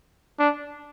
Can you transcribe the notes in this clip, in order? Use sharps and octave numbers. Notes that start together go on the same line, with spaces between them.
D4